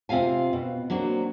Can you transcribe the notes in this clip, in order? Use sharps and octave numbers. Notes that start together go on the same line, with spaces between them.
C3 C4 F4 F5 G#5
B2
F#3 A#3 C4 D4